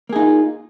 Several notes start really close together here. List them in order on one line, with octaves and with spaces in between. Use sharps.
A#3 G#4 D#4 F4